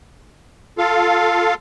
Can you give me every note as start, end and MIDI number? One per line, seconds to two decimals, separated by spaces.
0.78 1.54 65
0.78 1.54 69
0.78 1.54 77